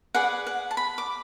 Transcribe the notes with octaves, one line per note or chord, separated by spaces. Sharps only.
G#4 B4 D5 F#5
F#5
A5
B5
D6